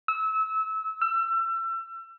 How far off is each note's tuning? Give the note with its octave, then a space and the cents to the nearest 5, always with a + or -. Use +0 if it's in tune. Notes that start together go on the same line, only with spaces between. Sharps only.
E6 -25
E6 +35